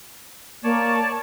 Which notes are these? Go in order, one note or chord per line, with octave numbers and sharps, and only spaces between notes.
A#3 C#5 D5 A5